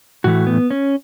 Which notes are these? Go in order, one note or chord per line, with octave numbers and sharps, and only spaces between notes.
A2 E3 A3 F#4
B3
C#4